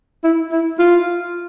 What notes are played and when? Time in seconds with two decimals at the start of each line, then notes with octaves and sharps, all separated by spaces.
0.24 E4
0.52 E4
0.79 F4